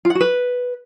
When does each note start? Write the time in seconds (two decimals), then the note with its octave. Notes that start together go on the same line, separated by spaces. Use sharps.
0.05 F4
0.10 F#5
0.15 F#4
0.20 B4